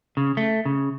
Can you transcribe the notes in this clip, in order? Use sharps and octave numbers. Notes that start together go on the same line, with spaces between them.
C#3
A3
C#3